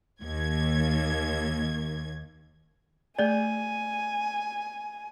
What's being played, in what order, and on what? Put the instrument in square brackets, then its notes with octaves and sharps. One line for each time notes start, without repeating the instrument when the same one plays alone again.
[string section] D#2 G#6
[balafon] A3 G#4 [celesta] D5 [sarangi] G#5